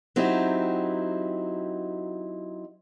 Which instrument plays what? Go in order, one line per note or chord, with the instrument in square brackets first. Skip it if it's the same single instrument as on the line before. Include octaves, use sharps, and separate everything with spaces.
[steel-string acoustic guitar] F#3 C4 D#4 E4 F#4 G4